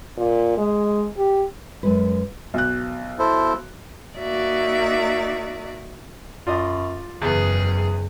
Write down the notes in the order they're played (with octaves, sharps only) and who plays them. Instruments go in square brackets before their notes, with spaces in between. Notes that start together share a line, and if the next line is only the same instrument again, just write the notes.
[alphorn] A#2
G#3
G4
[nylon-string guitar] F#2 G#3 B4
[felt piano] B1 F#6
[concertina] E4 A4 C5
[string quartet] A#3 D#4 F#4 D5 E5
[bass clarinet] F#2 [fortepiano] F4 D5 D#5
[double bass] F#1 [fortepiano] E2 B3 [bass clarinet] C#3 [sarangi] G#4